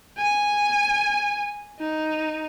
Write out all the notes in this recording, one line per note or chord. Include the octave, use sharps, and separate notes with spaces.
G#5
D#4